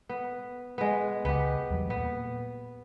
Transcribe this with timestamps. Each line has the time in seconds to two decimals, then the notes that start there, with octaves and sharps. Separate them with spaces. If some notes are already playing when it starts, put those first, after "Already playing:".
0.09 B3
0.78 G#3 B3
1.25 C#2 B3 G4
1.70 E2 F#3 G3
1.90 A#2 B3